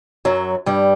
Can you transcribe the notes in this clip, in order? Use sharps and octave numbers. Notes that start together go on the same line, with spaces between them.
F#2 F#3
G2 G3